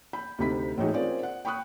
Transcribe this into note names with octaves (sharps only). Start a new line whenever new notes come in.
B5 G6
D2 C3 D#4 B5 B6
A2 E3 G#3 D#4 F#4 G#4
C4 C#4 F4 G#4 A#4 D5
F#5
G5 B5 C#6 D#6 F#6